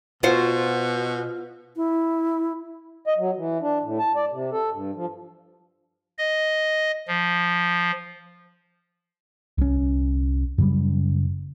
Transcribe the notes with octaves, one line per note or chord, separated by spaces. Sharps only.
B2 F4 F#4 C5
E4
D#5
F#3
E3
D4
A2
A5
D5
C3
A4
G2
F3
D#5
F3
C2 C#4
F#2 C#3 G3